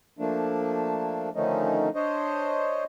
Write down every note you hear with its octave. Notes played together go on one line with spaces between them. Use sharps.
F3 A3 A#3 D4
D3 D#3 F3 A3 C#4 D#4
D4 C5 C#5 D#5